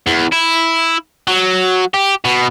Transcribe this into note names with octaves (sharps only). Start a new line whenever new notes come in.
E2
E4
F#3
G4
B2